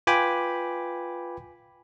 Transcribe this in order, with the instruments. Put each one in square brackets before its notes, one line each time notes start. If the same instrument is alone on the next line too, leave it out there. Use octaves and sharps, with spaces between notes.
[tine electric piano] F4 B4 G5 G#5 B5 D6